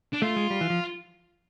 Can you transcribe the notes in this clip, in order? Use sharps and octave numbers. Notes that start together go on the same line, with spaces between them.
D4
A3 F4
G#3
G3
E3
F3